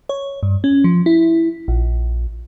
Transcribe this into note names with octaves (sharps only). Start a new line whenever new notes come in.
C#5
G2
C#4
F3
E4
A#1